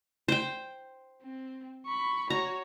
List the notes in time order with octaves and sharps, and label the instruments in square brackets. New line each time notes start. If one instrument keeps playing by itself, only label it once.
[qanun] C5 G5
[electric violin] C4
B5 C#6
[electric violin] F#4 C#5 [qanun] A#5